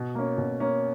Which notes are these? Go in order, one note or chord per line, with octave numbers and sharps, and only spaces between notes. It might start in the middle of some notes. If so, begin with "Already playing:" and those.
Already playing: B2
A#3 C#4
B2
A#3 C#4